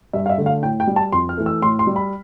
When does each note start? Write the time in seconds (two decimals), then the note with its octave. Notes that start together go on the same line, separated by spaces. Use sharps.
0.13 G2 E5
0.26 F5
0.29 E5
0.38 D3 A3
0.46 F5
0.63 A2 G5
0.80 G5
0.87 G3
0.96 A5
1.12 F2 C6
1.29 F6
1.37 E3 A3
1.46 E6
1.62 A2 C6
1.79 C6
1.87 G3
1.96 B5